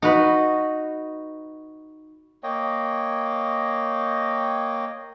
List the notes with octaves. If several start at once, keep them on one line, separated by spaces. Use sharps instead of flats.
D#4 F#4 B4
A#3 C#5 D#5 G5